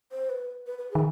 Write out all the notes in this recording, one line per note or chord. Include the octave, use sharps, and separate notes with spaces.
C5
B4
B4
B4
D#3 G#4